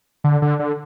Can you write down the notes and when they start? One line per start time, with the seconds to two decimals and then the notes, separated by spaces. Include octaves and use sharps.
0.24 D3
0.42 D3
0.59 D3